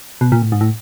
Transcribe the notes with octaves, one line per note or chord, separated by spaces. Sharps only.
B2
A#2
A2
G#2
A2